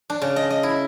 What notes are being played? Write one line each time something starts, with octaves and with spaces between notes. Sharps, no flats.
D4
C#3
D#5
D#5
E4